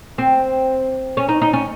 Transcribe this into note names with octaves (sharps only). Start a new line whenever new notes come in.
C4
C#4
D#4
D#4
C#4